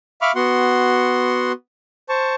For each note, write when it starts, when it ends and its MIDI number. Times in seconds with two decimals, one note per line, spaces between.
0.22 0.32 76
0.22 0.32 77
0.22 0.32 83
0.22 0.32 85
0.22 0.32 86
0.22 0.32 89
0.35 1.52 59
0.35 1.52 66
0.35 1.52 78
0.35 1.52 84
2.09 2.35 72
2.09 2.35 81
2.09 2.35 85